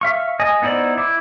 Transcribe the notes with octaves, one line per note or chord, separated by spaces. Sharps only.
E5 F5 C#6
D#5 G#5
B3 D#4 E4 C5 D5
E4 D6